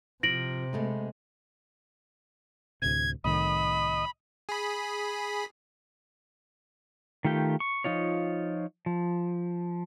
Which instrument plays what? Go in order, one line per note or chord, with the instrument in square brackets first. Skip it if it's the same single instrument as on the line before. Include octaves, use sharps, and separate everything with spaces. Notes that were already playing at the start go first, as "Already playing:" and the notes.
[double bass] C3 [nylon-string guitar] F3 [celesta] A#6 D7 F#7
[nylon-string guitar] G#3 A3 B3
[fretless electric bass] D2 A2 C3 [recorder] G#6
[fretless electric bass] C2 A2 D#3 [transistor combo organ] D#5 [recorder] B5
[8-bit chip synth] G#4 B5
[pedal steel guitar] D#3 A3 F4 G4 G5
C#6
F3 D#4 F4 C#5
F3